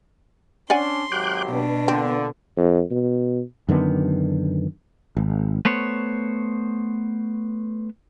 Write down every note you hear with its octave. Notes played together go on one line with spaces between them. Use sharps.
C#4 D4 D5 F#5 G#5 C6
G#1 F#3 G4 D6 F#6 G6
B2 B3 D4
A#2 D3 C4
F2
B2
F#2 D3 D#3 B3
G#1
A3 B3 C5 C#5